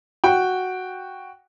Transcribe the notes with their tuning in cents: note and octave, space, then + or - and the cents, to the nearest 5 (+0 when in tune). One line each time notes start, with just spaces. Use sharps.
F#4 +0 G5 +0